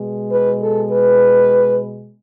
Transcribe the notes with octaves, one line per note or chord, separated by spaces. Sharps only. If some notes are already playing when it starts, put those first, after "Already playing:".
Already playing: B2 G#3
B4
A4
B4